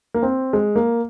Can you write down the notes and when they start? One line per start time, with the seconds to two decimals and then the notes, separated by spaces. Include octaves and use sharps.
0.14 A#3
0.23 C4
0.53 G#3
0.76 A#3